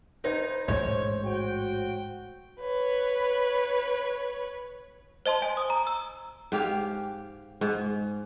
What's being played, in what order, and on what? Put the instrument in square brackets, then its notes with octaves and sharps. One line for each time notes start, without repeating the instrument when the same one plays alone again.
[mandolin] D#4 [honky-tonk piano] B4 C5 G#6
[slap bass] A1 G#2 G#3 [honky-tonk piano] C5 [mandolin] C#5
[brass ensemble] F#4 G5
[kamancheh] B4 C#5
[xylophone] C5 D#5 A5 C6
D#5 G#5
D#6
A#5
E6
[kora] G#2 G4 F5
G#2